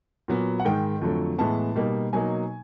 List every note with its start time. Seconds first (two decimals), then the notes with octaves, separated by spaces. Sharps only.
0.28 A#2 F#3 B3
0.60 F#5
0.65 G#2 D#3 G#3 G5
1.02 F2 D3 F#3 A3
1.38 A2 E3 G#3 B3 A5
1.75 B2 G3 A#3 D#4
2.13 B2 F#3 A#3 D#4 G#5